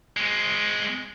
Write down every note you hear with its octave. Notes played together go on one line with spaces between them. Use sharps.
G#3 C4